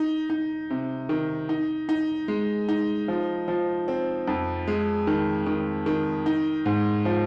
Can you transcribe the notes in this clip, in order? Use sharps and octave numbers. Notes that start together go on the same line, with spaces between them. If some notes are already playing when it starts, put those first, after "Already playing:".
Already playing: D#4
D#4
C3
D#3
D#4
D#4
G#3
D#4
F3
F3
C4
F2
G#3
D#3
D#3
D#3
D#4
G#2
F3